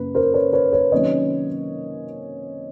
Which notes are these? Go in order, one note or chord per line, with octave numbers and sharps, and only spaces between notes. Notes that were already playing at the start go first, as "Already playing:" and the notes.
Already playing: F#2 C#3 A#3 C#4 B4
A#4 C5
B4 C#5
B4 C#5
B4 C#5
C3 D#3 F#3 A#3 C#4 C#5 D#5